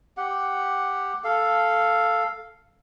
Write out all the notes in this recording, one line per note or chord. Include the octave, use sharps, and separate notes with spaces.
G4 F#5
A4 F5